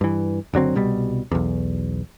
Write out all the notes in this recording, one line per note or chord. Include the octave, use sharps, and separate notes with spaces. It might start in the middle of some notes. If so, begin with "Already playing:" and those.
G2 E3
F#1 D3 F#3 C4
C2 B2 G3
B1 E2